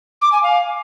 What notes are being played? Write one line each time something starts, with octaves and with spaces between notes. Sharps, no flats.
D6
G#5
F5